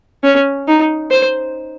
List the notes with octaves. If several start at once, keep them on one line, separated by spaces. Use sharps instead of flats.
C#4
D#4
C5